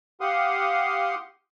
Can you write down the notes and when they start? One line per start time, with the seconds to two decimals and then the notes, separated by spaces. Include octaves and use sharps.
0.21 G4 F5 F#5 C6 D#6